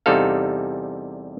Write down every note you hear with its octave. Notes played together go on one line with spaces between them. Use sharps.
E2 C3 G3 D#4 A4 F5